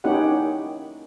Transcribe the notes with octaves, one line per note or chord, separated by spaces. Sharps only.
A#3 C#4 D#4 E4 G4 F#5